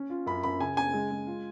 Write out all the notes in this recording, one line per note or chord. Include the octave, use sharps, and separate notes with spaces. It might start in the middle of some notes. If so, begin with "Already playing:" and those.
Already playing: C#4
F4
F#2 B5
F#2 B5
C#3 G#5
C#3 G#5
G#3
G#3
F4